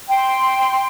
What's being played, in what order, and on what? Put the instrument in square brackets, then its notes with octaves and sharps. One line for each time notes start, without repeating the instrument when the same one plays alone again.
[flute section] G5 C6